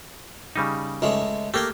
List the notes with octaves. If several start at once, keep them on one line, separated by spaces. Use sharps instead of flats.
C#3 G3 D#4
C#2 G#3 A3
A3 A#3 G4 A#4 G5